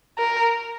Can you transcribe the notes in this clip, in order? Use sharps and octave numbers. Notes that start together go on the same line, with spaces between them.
A#4